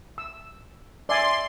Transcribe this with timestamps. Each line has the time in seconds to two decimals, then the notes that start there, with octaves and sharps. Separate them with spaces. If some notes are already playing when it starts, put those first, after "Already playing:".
0.18 E6
1.09 D5 E5 G#5 C6